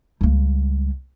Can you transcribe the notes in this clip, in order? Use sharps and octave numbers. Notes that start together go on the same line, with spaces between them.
C#2 G3